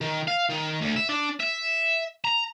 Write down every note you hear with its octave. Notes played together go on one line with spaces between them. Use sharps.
D#3
F5
D#3
D2
E5
D4
E5
A#5